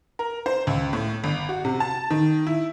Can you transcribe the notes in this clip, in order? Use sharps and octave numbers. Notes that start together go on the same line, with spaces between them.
A#4
C5
C#2
A2
G1
F#4
C3
A5
D#3
E4